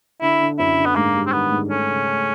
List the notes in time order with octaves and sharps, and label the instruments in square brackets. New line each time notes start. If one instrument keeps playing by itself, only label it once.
[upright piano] D3 [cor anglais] E4
[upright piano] D3
[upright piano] F#2 [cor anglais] E4
[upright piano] D3
[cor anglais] B3
[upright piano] G#2 [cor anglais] A#3
[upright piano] G3
[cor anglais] C4
[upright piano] D#3 [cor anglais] B3
[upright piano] G#2
[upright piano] A3 [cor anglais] C#4
[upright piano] C#3
A3